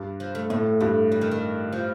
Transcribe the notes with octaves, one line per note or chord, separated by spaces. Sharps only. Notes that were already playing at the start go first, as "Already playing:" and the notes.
Already playing: G2
F3
A3
A2 A3
G2 A3
G3
D#3
D#3
F3